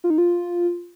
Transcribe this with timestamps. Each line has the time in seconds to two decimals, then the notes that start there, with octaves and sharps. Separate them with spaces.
0.04 F4
0.10 D#4
0.18 F4